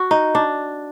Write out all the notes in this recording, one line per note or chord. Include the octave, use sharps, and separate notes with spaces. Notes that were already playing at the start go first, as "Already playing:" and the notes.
Already playing: F#4
D#4
D4